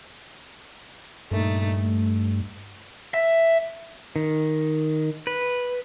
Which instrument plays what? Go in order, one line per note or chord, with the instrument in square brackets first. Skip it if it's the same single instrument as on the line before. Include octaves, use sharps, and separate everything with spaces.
[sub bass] G2 [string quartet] A#2 A3 D#4
[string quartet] A3
[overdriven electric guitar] E5
[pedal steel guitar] D#3
B4